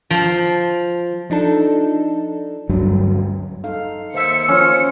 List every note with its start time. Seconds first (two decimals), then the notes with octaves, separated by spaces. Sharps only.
0.10 F3
1.30 F3 D4 D#4 A4
2.69 D2 G2 F#3
3.64 D#4 A4 F5
4.14 D#2 C5 E5 C#7
4.48 F3 C#4 F4 C5